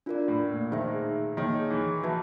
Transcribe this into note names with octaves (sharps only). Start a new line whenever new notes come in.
D4 F4 A#4 D5
A2
A#2
D#3 D#4 G#4 C5 E5
D#3 A#3 D#4 G#4 C#5
E3
E3 F#4 B4 E5 A5